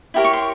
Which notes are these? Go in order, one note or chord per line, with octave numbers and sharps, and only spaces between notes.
E4 G4 A#4 C#5
C#6
C6